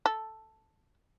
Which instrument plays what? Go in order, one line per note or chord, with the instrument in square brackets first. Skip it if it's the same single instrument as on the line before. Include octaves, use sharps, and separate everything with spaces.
[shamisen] A4